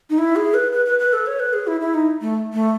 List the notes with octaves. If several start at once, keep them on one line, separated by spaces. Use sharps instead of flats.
D#4
E4
G#4
B4
B4
B4
B4
A4
C#5
B4
G#4
E4
E4
D#4
A3
A3